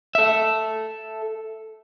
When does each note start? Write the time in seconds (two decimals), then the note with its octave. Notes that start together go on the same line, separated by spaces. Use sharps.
0.15 A4 E5